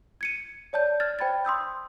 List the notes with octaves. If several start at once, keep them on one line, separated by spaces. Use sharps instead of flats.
G#6 C#7 D#7
C#5 D5 A5 G6
F6 G#6 A6
C5 G5 B5 G#6 A6
C6 D#6 E6 G6